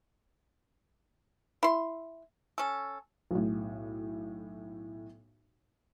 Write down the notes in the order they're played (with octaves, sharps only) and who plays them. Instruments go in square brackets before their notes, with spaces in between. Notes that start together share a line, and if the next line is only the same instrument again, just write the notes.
[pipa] E4 C6
C#4 A4
[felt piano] B1 A2